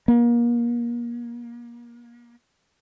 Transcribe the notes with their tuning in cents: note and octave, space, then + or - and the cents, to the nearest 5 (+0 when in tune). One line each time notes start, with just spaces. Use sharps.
A#3 +30